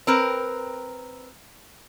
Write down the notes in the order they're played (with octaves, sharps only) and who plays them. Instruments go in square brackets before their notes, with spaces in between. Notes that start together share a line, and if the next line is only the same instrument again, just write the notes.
[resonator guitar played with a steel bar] C4 A#4 B4